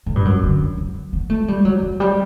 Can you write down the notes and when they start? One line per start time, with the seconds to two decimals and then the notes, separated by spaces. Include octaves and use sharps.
0.06 A2
0.16 G2
0.25 F#2
0.43 D3
0.77 F#3
1.13 B3
1.30 A3
1.48 G3
1.65 F#3
1.83 F#3
2.00 G3